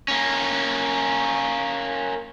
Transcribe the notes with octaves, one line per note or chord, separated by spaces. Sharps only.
A#3 C#4